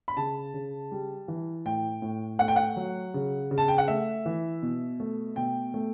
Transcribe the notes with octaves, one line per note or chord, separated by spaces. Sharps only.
B5
C#3 A5
C#3
G3
E3
A2 G5
A2
A3 F#5
G5
F#5
F#3
C#3
C#3
A5
G5
F#5
A3 E5
E3
B2
A3
B2 G5
A3